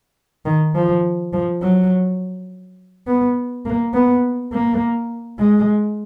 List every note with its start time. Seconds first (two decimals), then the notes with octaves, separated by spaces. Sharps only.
0.45 D#3
0.75 F3
1.33 F3
1.62 F#3
3.07 B3
3.66 A#3
3.94 B3
4.53 A#3
5.39 G#3